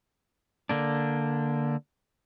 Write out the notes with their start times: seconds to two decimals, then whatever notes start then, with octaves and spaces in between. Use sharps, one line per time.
0.69 D3 A#3 D4